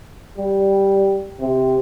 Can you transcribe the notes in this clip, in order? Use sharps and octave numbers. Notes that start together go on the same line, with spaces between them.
G3
C3